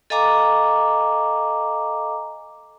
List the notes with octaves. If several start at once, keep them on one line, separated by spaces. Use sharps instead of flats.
A4 D#5 F5 G#5 A#5 D6